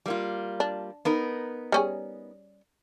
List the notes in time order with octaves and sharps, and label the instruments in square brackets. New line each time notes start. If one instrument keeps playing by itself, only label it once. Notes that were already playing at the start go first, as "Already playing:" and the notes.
[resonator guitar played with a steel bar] G3 A#3 F4
[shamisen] D4
[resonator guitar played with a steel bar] B3 D#4 A#4
[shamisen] G3 C#4 G#4